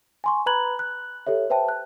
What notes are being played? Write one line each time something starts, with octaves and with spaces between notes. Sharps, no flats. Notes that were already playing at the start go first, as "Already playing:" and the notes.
G#5 C6 C#6
B4 A#5 B5 F#6 G#6 F#7
F#6
G4 A4 C#5 E5
B4 C5 E5 G5 A5
F#6